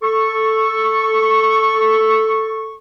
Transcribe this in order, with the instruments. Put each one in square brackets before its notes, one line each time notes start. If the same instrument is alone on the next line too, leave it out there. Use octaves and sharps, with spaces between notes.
[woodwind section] A4 C#6